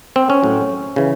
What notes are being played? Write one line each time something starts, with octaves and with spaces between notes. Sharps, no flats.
C4
C#4
A2 F#3
C#3 E3